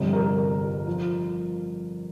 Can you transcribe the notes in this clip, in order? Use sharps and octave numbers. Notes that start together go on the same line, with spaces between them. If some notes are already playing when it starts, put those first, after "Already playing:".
Already playing: G1 F2 C3 G3
A#4
F3